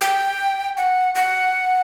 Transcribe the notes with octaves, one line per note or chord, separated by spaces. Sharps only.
G5
F#5
F#5